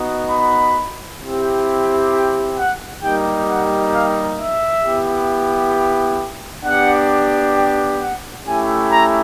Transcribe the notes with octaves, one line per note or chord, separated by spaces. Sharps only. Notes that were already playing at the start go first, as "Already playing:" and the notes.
Already playing: B3 D#4 F#4
B5
C4 E4 G4
G5
F#5
G3 A#3 D#4 G4 G5
F#5
F5
E5
B3 E4 G4
B3 D4 G4 F#5
G5
F#5
A3 C#4 E4 G4 G#5
A#5